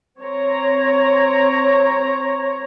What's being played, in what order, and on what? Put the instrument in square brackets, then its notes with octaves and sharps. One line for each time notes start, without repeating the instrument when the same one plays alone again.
[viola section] C4 C#5 A#5